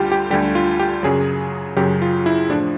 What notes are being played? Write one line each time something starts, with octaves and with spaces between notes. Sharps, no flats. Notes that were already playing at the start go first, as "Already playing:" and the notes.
Already playing: D2 D3 G3 F4 G4
G4
D2 D3 G3 G4
F4
G4
F#2 C#3 F#3 G#4
F#2 C#3 F#3 G4
F4
E4
A2 F3 D4